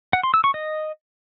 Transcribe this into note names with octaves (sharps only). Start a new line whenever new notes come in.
F#5
C6
E6
C#6
D#5